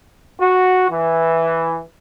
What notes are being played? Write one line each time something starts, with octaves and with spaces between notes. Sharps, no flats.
F#4
E3